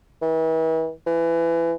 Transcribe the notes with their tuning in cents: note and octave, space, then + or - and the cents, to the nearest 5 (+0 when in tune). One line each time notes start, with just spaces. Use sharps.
E3 -40
E3 +20